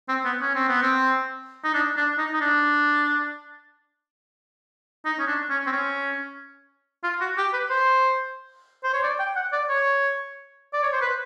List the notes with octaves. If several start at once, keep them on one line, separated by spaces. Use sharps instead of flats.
C4
B3
C#4
C4
B3
C4
D#4
D4
D4
D#4
D#4
D4
D#4
C#4
D4
C#4
C4
C#4
F4
F#4
G4
B4
C5
C5
C#5
D5
G5
F#5
D5
C#5
D5
C#5
C5
B4